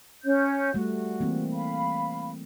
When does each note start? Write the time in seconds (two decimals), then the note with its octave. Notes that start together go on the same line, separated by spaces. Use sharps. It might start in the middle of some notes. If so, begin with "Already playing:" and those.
0.24 C#4 C#5 G6
0.74 G3 A3 F#4
1.20 E3 A#3 C4
1.53 F5 B5